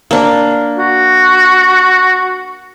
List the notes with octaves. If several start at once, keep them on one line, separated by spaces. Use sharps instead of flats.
A#3 D4
F#4